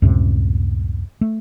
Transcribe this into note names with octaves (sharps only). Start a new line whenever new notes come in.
C#2 F#2 A2 C3
A3